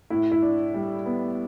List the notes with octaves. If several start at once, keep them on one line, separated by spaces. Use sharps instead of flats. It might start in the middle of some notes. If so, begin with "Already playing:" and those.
A2 E4
E4
D4
G3
B3